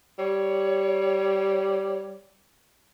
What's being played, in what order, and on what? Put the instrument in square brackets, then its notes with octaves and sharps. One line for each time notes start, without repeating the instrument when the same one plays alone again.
[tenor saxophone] G3 [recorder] C#5